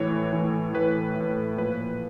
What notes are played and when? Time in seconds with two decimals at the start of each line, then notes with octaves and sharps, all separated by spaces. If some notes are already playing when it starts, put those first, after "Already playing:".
Already playing: A2 E3 C#5
0.33 A2 E3
0.74 A2 E3 B4
1.16 A2 E3
1.57 A#2 F3 B4